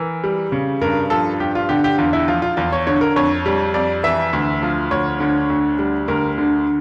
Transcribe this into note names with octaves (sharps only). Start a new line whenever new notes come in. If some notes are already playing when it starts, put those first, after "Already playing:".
Already playing: E3 A#4
G3
C#3
G2 A#4
F3 A4
G2 G4
F4
D3 G4
G4
E2 F4
E4
F3 F4
F4
E2 F4
C#5
D3 C#5
A#4
F2 C#5
G3
F2 D5
E3 E5
D2
F3
D2 C#5
D3
D2
G3
D2 A#4
D3